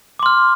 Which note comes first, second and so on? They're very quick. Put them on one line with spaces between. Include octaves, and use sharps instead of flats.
D6 C6 F6